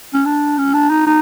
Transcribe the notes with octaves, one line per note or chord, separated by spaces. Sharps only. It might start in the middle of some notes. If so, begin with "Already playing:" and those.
C#4
D4
C#4
D4
D#4
D#4